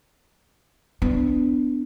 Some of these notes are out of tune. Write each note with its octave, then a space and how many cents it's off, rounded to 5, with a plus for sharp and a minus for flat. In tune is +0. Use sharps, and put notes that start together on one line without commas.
B3 +25 D4 +0